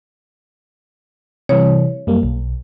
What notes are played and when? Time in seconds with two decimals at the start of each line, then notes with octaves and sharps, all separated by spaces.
1.49 C3 E3 G3 C#5
2.07 F#2 G3 A#3
2.23 B1